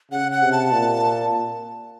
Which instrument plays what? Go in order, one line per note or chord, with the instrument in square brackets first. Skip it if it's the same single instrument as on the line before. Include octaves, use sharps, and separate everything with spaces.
[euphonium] C#3 [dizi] F#5
[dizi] F#5
[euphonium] C3
[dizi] A5
[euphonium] A#2